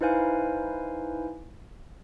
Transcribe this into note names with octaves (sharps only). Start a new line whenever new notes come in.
D#4 E4 B4 C5 F5 G#5